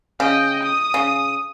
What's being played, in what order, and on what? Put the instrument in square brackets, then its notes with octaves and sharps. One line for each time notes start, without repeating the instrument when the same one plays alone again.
[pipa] C#3 [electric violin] D#5 G5
[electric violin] D#6
[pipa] C#3